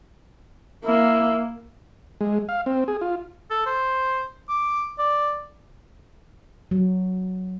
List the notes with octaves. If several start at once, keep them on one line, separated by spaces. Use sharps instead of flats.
A#3 E4
G#3
F5
C4
G#4
F4
A4
C5
D6
D5
F#3